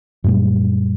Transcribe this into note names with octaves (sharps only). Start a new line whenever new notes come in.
F#2 A#2 G3